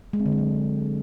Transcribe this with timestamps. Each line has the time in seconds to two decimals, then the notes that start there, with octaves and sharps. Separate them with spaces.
0.13 G#3
0.19 C4
0.26 D3
0.32 D4
0.38 F#3